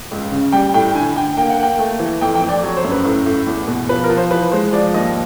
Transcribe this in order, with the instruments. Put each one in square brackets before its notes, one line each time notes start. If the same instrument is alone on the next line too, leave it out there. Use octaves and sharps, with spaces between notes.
[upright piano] C#2
C#3
G3 G5
A2 G5
D3 G#5
D3 G5
A#3 G5
F#5
A#3 G5
A3
E3
F2 G5
G5
F2
D5
F#3 C#5
C5
F#2
B4
A2
A2
E2
B2
F3 B4
A#4
F3
C5
E3 B4
G#3 C5
F3 D5
D#2 D#5